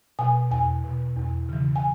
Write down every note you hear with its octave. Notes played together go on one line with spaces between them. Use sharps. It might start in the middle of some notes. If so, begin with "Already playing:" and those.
B2 G#5
E2 G#5
B2
E2
C#3 E3
G#5